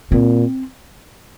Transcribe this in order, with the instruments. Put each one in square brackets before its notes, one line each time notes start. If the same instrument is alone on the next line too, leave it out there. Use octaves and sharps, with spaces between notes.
[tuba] A#2 [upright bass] C4